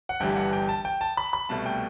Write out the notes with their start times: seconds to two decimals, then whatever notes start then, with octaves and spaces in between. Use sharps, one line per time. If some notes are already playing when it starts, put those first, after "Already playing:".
0.09 F#5
0.20 G1 G2 E3 G3 G5
0.36 F#5
0.53 G5
0.69 A5
0.85 G5
1.01 A5
1.17 B5
1.33 B5
1.49 C2 B2 A3 A5
1.66 G5